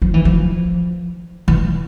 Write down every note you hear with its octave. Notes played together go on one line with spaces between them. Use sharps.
F3
E3
F3
E3